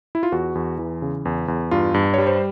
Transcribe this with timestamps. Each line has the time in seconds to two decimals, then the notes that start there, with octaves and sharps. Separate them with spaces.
0.15 E4
0.23 F4
0.32 E2 F#4
0.55 E2
0.78 E3
1.02 C#3
1.25 E2
1.48 E2
1.71 G2 F4
1.94 G2
2.14 G3 C#5
2.27 C5